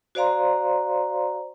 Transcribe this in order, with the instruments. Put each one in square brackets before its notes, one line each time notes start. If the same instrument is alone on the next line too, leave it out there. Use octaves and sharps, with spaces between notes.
[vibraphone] F#4 C5 D5 F5 A#5 C6